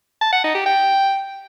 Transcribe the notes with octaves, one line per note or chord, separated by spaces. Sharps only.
A5
F#5
D#4
G4
G5